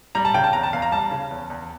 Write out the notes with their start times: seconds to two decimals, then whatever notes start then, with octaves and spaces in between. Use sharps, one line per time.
0.15 G3 A#5
0.25 A5
0.34 C#3 G5
0.44 A5
0.53 E2 A#5
0.63 A5
0.73 E2 F5
0.82 A#5
0.92 G3 A5
1.11 C#3
1.31 E2
1.50 E2